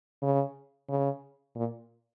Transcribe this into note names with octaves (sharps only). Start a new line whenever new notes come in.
C#3
C#3
A#2